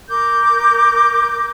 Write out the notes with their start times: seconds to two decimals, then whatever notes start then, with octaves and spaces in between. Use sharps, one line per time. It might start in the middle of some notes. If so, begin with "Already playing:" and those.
0.08 A#4 D6 G6